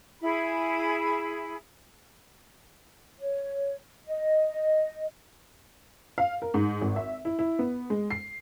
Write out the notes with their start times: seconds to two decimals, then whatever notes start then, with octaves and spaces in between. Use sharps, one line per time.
0.21 E4 G#4 B5
3.20 C#5
4.06 D#5
6.18 F5
6.42 A#4
6.54 G#2
6.81 G#1
6.96 E5
7.25 E4
7.39 E4
7.59 B3
7.90 G#3
8.11 C7